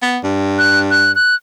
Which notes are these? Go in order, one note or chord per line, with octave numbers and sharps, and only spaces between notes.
B3
G2
F#6
F#6
F#6